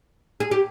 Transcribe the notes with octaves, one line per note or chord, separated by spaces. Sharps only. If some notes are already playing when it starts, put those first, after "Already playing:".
G#4
G4